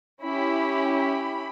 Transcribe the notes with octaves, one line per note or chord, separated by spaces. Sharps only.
C#4 E4 G4 B5
B5